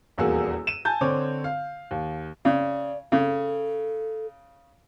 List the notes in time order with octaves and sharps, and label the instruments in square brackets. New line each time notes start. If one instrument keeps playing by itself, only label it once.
[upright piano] D#1 E2 A#3 F#4 G#4 E6
D#7 E7
G#5 A5 G6
D3 C4 C#5 D6
F5
D#2
[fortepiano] C#3 [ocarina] D5
[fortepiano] C#3 [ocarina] A4